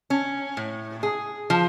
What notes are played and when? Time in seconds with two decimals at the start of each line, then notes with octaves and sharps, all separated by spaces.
0.10 C#4
0.57 A2
1.03 G#4
1.50 F3